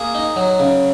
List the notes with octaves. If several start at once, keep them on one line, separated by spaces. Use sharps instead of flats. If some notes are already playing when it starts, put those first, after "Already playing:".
Already playing: A#3 G#4
D#4
F#3
C#3